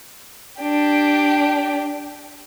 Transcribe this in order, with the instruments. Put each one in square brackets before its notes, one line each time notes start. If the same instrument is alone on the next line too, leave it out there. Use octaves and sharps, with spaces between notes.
[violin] D4 G4